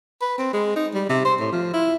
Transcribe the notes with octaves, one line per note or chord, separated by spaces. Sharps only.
B4
C4
G#3
D#4
G3
C3
C5
A2
F3
E4